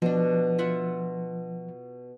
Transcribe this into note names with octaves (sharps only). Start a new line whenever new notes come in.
B2 F3 D4
F4 E5 F#5